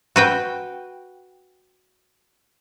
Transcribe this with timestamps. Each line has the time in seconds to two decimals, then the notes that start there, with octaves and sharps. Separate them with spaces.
0.16 F#4 B4 G5